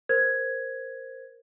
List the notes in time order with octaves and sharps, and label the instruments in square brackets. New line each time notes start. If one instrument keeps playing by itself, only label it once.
[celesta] A#4 C5 G#6